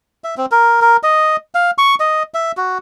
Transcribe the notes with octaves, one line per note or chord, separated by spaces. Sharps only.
E5
C4
A#4
A#4
D#5
F5
C#6
D#5
E5
F#4